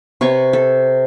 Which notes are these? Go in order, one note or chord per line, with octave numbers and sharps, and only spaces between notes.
C3 B4 C#5 C#6
A4